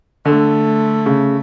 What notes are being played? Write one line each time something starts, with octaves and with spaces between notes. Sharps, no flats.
D3 A3
C#3